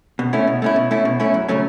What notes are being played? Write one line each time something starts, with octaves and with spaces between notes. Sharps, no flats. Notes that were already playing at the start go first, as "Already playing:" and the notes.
B2
A3 C#4 E4
B2
A3 C#4 E4
B2
A3 C#4 E4
B2
A3 C#4 E4
F#2
C#3 F#3 A3 C#4